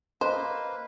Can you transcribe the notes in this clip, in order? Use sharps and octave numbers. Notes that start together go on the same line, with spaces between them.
A#3 B4 C5 D#5